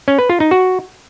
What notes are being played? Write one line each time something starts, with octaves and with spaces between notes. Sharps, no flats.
C#4
B4
F4
D#4
F#4